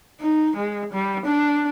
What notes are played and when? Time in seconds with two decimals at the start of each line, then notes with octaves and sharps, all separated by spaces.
0.20 D#4
0.56 G#3
0.93 G3
1.26 D4